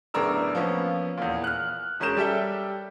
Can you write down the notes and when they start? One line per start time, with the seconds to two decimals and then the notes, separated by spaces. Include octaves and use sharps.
0.14 F#1 A2 B3 D4 A#4 E6
0.55 F3 A#3 B3 C#4
1.17 E2 A#2
1.44 F6 F#6
2.00 E1 C#4 G#4 A#4 G6 E7
2.17 G3 G4 A4 E5 G7